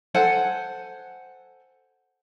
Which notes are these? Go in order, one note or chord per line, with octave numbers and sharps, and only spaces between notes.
A4 C5 F#5 G#5